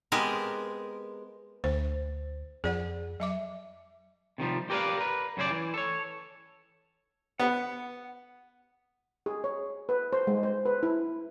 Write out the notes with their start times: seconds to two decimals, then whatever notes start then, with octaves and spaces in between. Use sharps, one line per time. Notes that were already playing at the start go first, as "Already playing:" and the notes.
0.12 G#3 B3 C4 G4 A#4
1.64 D2 C5
2.64 F2 G#4 D5 F#5
3.20 F#3 E5 D6
4.38 C3 D#3 F3 G3
4.70 G4 A#4 B4 C#5 D5 F5
4.97 A#4 B4
5.37 F#2 C#3 C#4 C5 D5
5.51 E3
5.74 A4 C#5
7.40 B3 F#5
9.26 G#4
9.44 C#5
9.89 B4
10.13 C5
10.27 G#3
10.43 C5
10.65 B4
10.83 E4